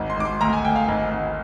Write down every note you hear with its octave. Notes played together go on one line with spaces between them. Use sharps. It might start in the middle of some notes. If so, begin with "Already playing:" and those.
Already playing: G#1
C6
G#1 D6
C6
D2 A#5
G#5
D2 G5
F5
G#1
G#1